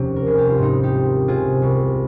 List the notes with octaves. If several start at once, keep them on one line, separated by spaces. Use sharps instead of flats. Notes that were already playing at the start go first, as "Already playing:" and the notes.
Already playing: F1 D#2 C3 A#3 C#4
A#4
C2 G#4
G4
F4
G#2 C4 D#4
D#4 G4
G#1
C3 F4 G#4
C2